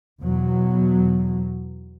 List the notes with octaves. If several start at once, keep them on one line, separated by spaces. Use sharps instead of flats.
E2 B2 F#3